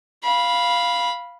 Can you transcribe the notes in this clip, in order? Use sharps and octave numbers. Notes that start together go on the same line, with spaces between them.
F5 B5